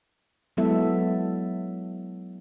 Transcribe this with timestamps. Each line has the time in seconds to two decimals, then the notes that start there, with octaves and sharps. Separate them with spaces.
0.57 F#3 G#3 B3 E4 A4 E5